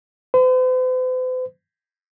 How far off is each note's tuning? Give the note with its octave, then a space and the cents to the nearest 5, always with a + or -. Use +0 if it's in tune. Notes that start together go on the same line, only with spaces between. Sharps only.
C5 -45